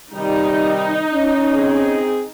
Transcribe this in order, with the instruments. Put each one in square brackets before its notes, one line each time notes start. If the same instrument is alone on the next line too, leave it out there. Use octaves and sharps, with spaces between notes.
[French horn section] C3 D#3 G3 [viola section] D#4
[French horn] C#4
[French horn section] C4 G#4